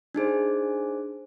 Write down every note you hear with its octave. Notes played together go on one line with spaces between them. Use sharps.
D4 D#4 G#4 C5